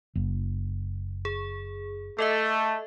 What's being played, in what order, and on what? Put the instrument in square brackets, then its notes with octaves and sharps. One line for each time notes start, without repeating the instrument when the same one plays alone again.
[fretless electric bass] F#1
[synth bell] G#4
[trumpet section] A3 [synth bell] A4 D#5 E5